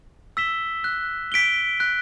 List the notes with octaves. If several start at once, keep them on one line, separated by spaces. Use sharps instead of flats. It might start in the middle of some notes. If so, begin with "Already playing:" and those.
E6 B6 E7 G7
F#6
B6 D7 G7
F#6